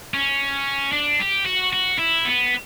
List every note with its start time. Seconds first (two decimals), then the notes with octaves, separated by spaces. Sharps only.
0.14 C#4
0.93 D4
1.20 G4
1.46 F#4
1.73 F#4
1.98 E4
2.25 B3